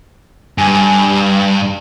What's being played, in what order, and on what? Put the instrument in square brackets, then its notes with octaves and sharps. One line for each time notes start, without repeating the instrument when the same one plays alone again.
[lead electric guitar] G2 [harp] G#5